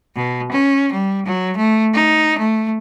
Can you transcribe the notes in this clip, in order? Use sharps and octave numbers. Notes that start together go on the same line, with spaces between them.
B2
C#4
G3
F#3
A3
D#4
A3